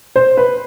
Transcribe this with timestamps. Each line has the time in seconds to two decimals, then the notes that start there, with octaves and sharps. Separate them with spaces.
0.16 C5
0.37 B4